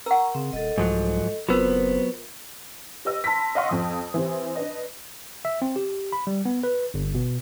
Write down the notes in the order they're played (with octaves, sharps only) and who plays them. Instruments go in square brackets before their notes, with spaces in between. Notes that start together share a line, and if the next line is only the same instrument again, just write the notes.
[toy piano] A#4 F#5 [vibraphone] A#5 C#6
[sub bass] C#3 [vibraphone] C4
[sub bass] D#1 [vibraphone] A4 D#5
[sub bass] C2 [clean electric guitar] G#2 F3 F#3
[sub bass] F#1 [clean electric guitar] F#3 B3 [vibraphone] C4 C5 [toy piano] F4 A#4
[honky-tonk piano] G4 B4 D#5 E6
A5 B5 C6 E6 A#6 B6
D#5 F5 F#5 C6 C#6
F2 F3 D#6
E3 C4 G4
D4 B4 D#5
[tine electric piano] E5
C4
G4
B5
G3
B3
B4
G1
B2